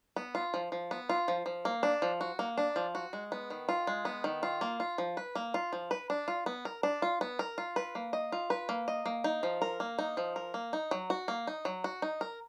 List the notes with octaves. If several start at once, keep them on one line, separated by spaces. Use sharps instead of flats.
B3
F4
F3
F3
B3
F4
F3
F3
A#3
D4
F3
F#4
A#3
D4
F3
F#4
G#3
B3
D#3
F4
G#3
B3
D#3
F4
A#3
F4
F3
B4
A#3
F4
F3
B4
D4
F4
B3
A#4
D4
F4
B3
A#4
F4
B4
A#3
D#5
F4
B4
A#3
D#5
A#3
D#4
F3
A#4
A#3
D#4
F3
A#4
A#3
D#4
F#3
F#4
A#3
D#4
F#3
F#4
D#4
A#4